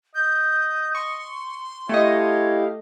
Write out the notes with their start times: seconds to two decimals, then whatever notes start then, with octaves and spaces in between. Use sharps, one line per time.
0.15 D#5 G6
0.95 C6 C#6
1.89 A3 E4 G4 C#5 D#5 F5